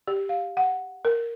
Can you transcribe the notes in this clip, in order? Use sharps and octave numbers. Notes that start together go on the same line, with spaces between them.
G4
F5
F#5
A#4